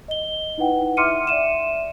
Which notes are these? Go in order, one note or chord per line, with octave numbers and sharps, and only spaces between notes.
D#5 G7
D#4 E4 B4 F#5 G5
E5 C6 D6 F6 C#7 D#7
D5 E5 D#7 E7